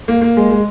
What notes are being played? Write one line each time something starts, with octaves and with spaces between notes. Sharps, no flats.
A#3
A#3
G#3
G#3